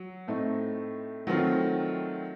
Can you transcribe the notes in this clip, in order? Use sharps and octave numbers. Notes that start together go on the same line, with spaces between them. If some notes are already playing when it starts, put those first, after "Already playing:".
Already playing: F#3
A2 A3 C4 D#4
D#3 F#3 A3 C4 F4